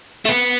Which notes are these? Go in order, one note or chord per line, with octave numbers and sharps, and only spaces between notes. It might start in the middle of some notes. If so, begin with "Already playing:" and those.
A3
B3